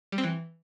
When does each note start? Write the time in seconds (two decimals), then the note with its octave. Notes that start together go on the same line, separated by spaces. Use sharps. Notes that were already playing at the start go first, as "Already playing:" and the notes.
0.12 G3
0.18 C4
0.24 E3